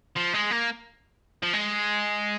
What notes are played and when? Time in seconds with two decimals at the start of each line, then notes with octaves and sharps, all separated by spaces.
0.17 F3
0.34 G#3
0.51 A#3
1.43 F3
1.54 G#3